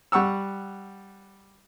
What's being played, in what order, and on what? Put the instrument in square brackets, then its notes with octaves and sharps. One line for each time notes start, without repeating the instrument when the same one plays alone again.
[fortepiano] G3 F#5 C#6 E6